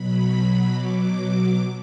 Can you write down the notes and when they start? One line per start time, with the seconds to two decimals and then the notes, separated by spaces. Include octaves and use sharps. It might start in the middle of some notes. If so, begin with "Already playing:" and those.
Already playing: B2 F#3 B5
0.70 D6